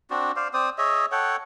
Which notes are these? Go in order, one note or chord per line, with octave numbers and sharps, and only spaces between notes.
C4 D4 F#4
C5 D5 F5
C4 C5 D5 D#6
G#4 C#5 D#5 E5
A4 C#5 F#5 G5